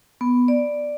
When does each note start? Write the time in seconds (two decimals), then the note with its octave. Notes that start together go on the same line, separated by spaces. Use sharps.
0.21 B3
0.48 D5